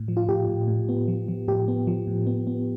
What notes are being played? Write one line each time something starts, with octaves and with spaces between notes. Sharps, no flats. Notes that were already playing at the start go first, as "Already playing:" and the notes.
Already playing: A2
F3
F4
A2 G4
A2
A2
B3
F3
F3
A2 G4
B3
F3
A2
B3
B3